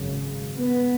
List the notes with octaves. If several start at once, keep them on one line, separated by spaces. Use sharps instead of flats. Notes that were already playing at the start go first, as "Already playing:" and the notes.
Already playing: G#1 F#2 C#3
B3